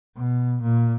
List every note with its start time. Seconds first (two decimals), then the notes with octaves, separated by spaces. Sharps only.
0.16 B2
0.63 A#2